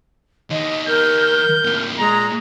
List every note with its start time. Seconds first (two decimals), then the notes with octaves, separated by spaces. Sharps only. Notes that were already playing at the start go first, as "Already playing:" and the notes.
0.50 D#3 C#5 D#5
0.87 A#4 G6
1.18 G6
1.64 D#2 A2
1.99 A#2 G#3 A#5